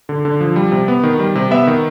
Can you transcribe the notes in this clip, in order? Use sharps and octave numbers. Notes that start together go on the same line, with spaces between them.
D3
D3
F3
G3
C3
B3
D#3
G3
C3
B3 E5
D#3